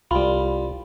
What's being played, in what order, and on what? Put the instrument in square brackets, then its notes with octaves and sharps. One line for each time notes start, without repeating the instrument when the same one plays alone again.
[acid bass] C2 [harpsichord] G3 F4 [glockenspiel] B5